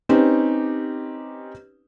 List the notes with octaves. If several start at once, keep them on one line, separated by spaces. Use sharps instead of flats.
C4 C#4 D#4 G4 B4